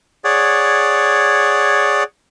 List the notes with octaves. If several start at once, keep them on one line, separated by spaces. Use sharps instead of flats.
G#4 C#5 D5 F#5